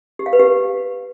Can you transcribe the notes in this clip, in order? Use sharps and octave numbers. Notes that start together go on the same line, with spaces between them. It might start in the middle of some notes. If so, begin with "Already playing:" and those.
G4
F5
B4
G4